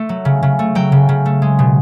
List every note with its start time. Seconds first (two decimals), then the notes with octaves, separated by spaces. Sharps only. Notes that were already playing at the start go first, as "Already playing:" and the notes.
Already playing: A3
0.09 F#3
0.25 C#3
0.43 C#3
0.59 A3
0.75 F#3 G5
0.92 C#3
1.09 C#3
1.26 A3
1.42 G#3
1.59 B2